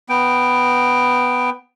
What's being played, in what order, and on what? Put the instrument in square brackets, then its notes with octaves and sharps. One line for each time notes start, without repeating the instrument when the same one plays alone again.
[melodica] B3 G5